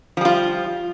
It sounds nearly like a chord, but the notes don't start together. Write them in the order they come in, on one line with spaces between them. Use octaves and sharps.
F3 G3 F4